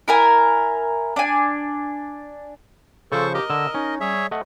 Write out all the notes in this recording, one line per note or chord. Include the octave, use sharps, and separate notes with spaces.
E4 A#4 G#5
D4 G#5
C#3 F3 A4 C5 C#6
G4 A#4 D#5
D3 E6
C#4 D#4
G3 G#4 C#5 E5
A3 D#5 F#5